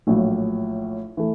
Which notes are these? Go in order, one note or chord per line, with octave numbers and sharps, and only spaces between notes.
A#1 A2 F#3
E3 A3